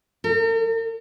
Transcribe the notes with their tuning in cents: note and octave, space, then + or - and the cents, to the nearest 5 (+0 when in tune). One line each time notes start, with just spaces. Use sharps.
A#4 -45